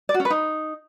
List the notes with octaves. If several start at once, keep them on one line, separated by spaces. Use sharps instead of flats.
D5
F#4
C#4
B4
D#4